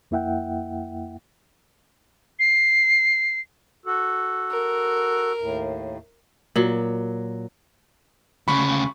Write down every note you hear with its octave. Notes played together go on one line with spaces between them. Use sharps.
F2 A#3 E4 E5 F#5 G5
C7
F#4 A4
A#4
D#2 A2
A#2 F#3
D2 C#3 B5 C#6